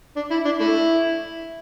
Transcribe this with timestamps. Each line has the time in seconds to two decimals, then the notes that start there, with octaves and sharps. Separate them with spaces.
0.16 D4
0.31 E4
0.45 D4
0.60 A3 E4